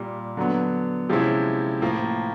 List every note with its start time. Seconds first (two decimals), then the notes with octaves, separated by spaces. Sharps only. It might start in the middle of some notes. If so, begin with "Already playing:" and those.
Already playing: A#2 G3 A#3
0.37 D3 F#3 B3
1.09 C3 F3 G#3 C#4 E4
1.81 A2 F3 A#3